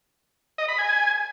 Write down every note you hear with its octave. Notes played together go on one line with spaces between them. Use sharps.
D#5
B5
G#5